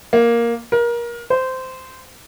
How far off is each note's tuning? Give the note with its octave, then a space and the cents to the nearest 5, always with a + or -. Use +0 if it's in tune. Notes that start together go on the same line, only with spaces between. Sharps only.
A#3 +5
A#4 +25
C5 -15